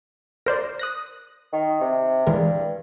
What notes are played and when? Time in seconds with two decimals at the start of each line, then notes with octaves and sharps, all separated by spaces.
0.46 A#4 C5 D5
0.79 D#6 F#6 A#6
1.53 D#3
1.81 C3
2.27 G2 E3 G#3 A#4